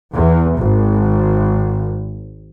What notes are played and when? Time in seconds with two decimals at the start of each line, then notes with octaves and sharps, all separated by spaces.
0.13 E2
0.58 G#1